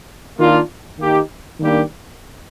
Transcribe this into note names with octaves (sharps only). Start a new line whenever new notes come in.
D#3 A#3 D4 F4
D#3 A#3 D#4 G4
D#3 G3 A#3 D4 G4